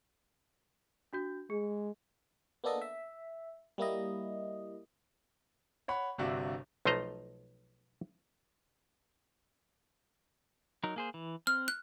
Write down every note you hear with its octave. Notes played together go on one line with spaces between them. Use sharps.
D4 F#4 G6
G#3 G#4
A#3 B3 D4 A4 D#5
E5
G3 A#3 E4 D#5
C#5 F#5 B5
G1 G2 C3 D4 F#4 E5
B1 F3 A3 C5 D#5 A#5
F#3 D#4 A#4
A#3 G#4 C5
E3
C4 F6
F#6